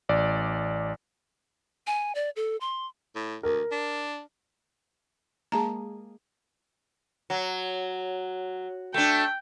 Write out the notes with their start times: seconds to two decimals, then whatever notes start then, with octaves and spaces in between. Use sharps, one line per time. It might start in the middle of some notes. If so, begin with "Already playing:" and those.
0.09 A1 D5
1.87 G#5
2.15 D5
2.36 A4
2.61 C6
3.16 A2
3.43 D2 A#4
3.72 D4
5.52 G#3 A#3 G#4 A5 A#5
7.30 F#3
8.94 A3 D4 G5